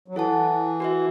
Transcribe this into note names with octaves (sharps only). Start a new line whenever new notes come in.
F#3
E3 E4 A4 F#5 A5
F#4 B4 E5